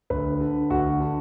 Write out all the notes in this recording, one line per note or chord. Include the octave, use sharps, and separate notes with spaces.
D2 B4
D3
D2 F#4
D3